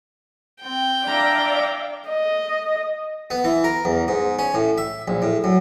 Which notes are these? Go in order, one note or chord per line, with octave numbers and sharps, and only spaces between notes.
C4 G5
D4 D5 E5 F5 A#5
D#5
B3
E3
A#4
E2
G#2
C#4
A2
E5
A#1
A2
F#2